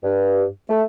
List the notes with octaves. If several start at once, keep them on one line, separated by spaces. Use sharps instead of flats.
G2
A3